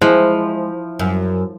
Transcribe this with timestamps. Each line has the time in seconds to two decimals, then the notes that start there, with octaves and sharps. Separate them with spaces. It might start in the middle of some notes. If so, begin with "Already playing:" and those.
0.02 F3 G#3 E4 C5 E5
0.99 F#2